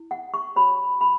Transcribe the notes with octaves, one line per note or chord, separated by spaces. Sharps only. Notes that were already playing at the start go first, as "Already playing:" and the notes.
Already playing: E4
F#5
C#6
F#4 C#5 B5
B5